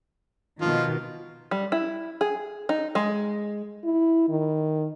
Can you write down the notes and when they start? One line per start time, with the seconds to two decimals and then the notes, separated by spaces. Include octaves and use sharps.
0.61 B2 D#3 F3
1.51 G3
1.72 E4
2.21 G#4
2.69 D#4
2.95 G#3
3.84 E4
4.29 D#3